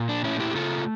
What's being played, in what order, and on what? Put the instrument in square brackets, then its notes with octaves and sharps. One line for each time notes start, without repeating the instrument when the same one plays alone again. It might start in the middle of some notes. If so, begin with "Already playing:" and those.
Already playing: [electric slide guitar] A#2
D4
A3 C#4 E4
E4 G4
G4
C#3 F4 A4